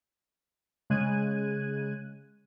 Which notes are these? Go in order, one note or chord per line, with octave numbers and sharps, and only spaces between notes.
C#3 G#3 F#6 G#6 D#7